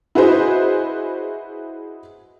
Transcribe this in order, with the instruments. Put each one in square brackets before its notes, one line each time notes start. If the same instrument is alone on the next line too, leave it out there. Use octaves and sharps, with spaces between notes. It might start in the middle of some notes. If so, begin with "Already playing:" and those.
[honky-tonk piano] E4 F#4 G#4 B4 C5 D#5